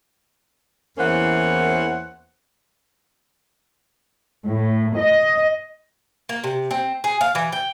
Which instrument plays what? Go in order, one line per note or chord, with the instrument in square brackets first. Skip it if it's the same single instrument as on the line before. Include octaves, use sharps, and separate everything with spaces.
[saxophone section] E2 E3 A#3 C#4 C5 F#5
[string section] A2
D#5
[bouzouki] A#3
C3
C4
G#4
F5
E3
G5